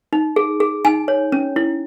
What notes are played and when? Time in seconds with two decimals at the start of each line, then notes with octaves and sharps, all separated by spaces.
0.13 D#4
0.36 G#4
0.60 G#4
0.85 D#4 G#5
1.08 C#5
1.32 C#4
1.56 E4